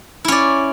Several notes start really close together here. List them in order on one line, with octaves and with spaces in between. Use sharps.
E4 C#4 D5